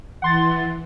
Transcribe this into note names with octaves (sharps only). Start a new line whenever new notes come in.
E3 F#5 C6 A6